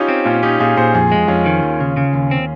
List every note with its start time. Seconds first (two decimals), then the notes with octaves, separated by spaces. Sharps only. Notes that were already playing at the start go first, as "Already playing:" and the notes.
Already playing: C#4 D#4 F4 G4
0.08 C4
0.26 A#2 C#4 F4
0.43 C#4 D#4 G4
0.60 A#2 F4 G#4
0.77 A#2 G#4 C5
0.94 F2 F4 G#4
1.12 G#3
1.28 F2 C#4 F4
1.46 D#3
1.63 D#2
1.80 C#3
1.97 C#3
2.13 D#2
2.31 C4